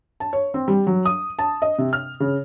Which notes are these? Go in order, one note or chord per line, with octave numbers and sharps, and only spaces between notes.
A5
C#5
C4
G3
F#3
D#6
A5
D#5
C3
F6
C#3